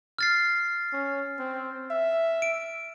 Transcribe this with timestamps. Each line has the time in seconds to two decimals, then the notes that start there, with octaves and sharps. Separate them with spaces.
0.18 F6 A6 C7
0.93 C#4
1.39 C4
1.91 E5
2.42 D7